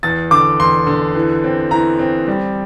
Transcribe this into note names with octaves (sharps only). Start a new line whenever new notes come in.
E2 A6
D3 D6
E2 C6
D3
E3
C4
E3 A#5
C4
G3